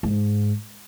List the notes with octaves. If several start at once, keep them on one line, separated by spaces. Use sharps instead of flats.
G#2